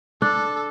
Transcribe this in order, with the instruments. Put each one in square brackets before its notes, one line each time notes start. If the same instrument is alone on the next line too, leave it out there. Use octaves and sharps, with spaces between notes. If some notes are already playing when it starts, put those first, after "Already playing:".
[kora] D4 [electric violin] A4